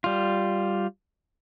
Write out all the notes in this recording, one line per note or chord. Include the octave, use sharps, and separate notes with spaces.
G3 F4